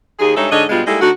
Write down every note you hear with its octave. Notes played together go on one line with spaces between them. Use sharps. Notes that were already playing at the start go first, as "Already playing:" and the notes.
D#2 G#4
G2 G#3 D#4 A4 C#5 E5
G#2 D3 C#5 D#5
G2 B2 G3 G#3 B3 F4
G3 G#3 A#3 D#4 E4 A4
D3 A3 D#4 F#4